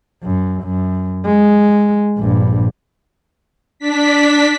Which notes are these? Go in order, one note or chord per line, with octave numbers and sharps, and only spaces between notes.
F#2
F#2
G#3
A#1 G2
D4 B6